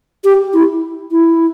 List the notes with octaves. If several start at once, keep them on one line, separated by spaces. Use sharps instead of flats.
G4
E4
E4